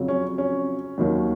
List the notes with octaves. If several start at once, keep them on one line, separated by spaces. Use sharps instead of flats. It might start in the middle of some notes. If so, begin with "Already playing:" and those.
Already playing: F2 C#3 F#3
C#4
C#4
D#2 D#3 F#3